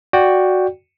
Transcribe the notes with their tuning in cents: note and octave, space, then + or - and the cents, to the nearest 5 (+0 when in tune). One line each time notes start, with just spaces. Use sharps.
F#4 +0 D5 +0 G5 +0